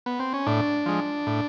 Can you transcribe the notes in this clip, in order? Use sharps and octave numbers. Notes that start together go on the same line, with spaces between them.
B3
C4
C#4
A2 D4
F3 G#3
A2